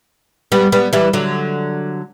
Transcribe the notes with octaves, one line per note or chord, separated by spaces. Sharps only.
G3 B3
G3 B3
E3 G3
D3 F#3